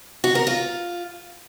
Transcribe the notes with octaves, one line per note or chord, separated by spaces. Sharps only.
F#4
A#4
F4